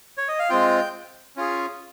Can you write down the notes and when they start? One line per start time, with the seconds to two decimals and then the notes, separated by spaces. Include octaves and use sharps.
0.18 C#5
0.28 D#5
0.39 F5
0.50 G#3 C4 F4 G5
1.36 C#4 F4 G#4